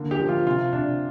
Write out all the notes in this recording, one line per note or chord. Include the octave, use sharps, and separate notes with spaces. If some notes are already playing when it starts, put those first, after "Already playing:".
Already playing: D3 A#3
G4
F3
F4
C3 F4
C3 D4